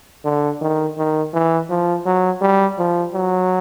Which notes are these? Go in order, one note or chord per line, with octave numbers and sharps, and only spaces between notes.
D3
D#3
D#3
E3
F3
F#3
G3
F3
F#3